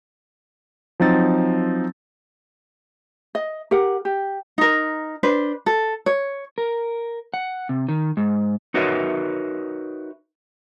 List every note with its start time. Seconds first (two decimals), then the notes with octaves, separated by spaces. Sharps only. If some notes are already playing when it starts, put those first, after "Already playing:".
1.00 F3 F#3 C4 D#4 A6
3.35 D#5
3.71 G4 A#4 F#5
4.05 G4
4.58 D#4 A#4
5.23 D4 B4 C5
5.66 A4
6.06 C#5
6.58 A#4
7.34 F#5
7.69 C3
7.89 D#3
8.17 G#2
8.74 D#4 F#4 A#4 B4 C#5 E5